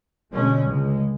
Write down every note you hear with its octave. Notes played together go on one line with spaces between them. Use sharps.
B2 D3 G#3 A3 C#4
C#2 G#3